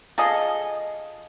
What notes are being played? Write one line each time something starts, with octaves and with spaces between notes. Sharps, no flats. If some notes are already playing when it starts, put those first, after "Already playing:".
F4 G#4 A4 D#5